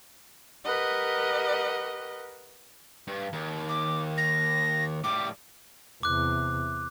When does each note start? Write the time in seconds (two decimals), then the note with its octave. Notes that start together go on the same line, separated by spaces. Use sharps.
0.65 G4 A#4 B4 D#5 F#5
3.08 G2
3.33 D#2
3.69 D6
4.18 A#6
5.04 A2 G3 D6
6.03 E2 C3 D6 F#6